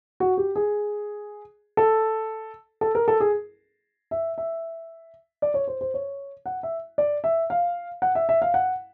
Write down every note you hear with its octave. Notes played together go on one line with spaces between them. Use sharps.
F#4
G4
G#4
A4
A4
A#4
A4
G#4
E5
E5
D5
C#5
C5
C5
C#5
F#5
E5
D5
E5
F5
F#5
E5
E5
F5
F#5